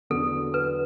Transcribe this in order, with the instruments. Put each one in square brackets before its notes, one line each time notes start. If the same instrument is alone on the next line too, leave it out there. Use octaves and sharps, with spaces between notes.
[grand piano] E2 D3 F#3 B3 [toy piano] A4
[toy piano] B4